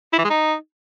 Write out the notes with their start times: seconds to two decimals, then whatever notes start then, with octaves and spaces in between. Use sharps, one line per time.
0.13 E4
0.19 E3
0.24 G#3
0.30 D#4